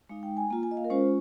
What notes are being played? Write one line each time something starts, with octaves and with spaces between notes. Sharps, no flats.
G#3 D#4 F5
G5
G#5
A#3 F4 A#5
G#5
D#5
F5
A#4
G#3 C#4 F4 C5